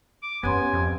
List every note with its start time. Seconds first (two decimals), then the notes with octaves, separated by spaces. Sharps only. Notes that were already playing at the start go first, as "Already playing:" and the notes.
0.22 D6
0.43 F#2 B3 C#4 G4 C#5 G#5 C6
0.73 F2